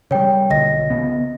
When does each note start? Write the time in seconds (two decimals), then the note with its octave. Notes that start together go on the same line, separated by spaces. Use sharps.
0.11 C#3 G3 C#5 G5
0.50 B1 D3 D#5 A#6
0.90 C#3 B3